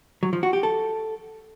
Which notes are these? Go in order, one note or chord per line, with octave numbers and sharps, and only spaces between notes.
F#3
F3
F#4
G4
A4